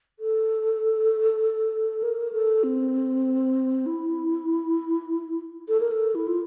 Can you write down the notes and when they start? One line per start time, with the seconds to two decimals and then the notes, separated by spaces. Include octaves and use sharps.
0.19 A4
2.03 A#4
2.33 A4
2.64 C4
3.86 E4
5.69 A4
5.80 A#4
5.91 A4
6.15 E4
6.27 F4